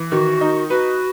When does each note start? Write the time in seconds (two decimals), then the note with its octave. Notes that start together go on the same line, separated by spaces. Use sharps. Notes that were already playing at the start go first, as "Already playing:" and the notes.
Already playing: E3
0.12 D#3 F#4
0.41 D#4
0.69 F#4 B4